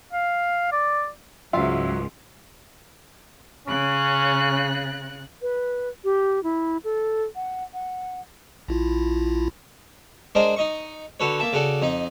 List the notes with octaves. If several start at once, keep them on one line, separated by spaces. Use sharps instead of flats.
F5
D5
C#2 G#2 F#3 F4 E5
C#3 C#4 F#6
B4
G4
E4
A4
F#5
F#5
A#1 E4 F4
G#3 D4 A#4 C5 D5 D#5
D#4 D#5 C#6
D3 F#4 A4 B4 C#5
A#3 E5 A5
C#3 F#4 A4 D5
F2 D#4 D#5